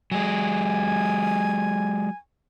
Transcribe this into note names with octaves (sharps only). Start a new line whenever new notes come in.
F#3 G#3 G#5